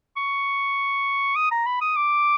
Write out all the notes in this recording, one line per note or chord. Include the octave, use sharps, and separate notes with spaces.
C#6
D#6
A#5
B5
D#6
D6